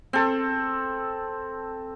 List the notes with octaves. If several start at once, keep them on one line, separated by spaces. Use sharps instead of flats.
C4 A4